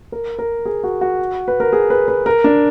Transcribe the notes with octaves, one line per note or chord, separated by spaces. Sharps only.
A#4
A#4
G#4
F#4
F#4
B4
A#4
G#4
B4
B4
A#4
D4